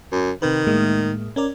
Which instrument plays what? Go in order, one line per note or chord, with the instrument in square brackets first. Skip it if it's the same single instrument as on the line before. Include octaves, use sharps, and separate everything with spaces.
[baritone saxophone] F#2
[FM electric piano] C3 B4 [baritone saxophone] D#3
[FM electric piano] A2 G#3 A#3
C#4 A#4 D5